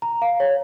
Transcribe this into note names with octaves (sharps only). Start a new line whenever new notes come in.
A#5
F5
C#5